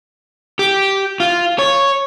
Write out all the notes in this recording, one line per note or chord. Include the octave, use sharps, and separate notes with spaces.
G4
F4
C#5